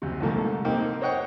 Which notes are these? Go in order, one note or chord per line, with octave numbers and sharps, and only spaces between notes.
D2 C3
C2 G#2 F3 A3 A#3
A#3 C4 D#4 G4 A#4
C5 C#5 D#5 F#5 G5 C#6